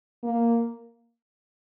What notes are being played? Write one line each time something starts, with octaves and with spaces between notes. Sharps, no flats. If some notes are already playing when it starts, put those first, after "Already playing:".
A#3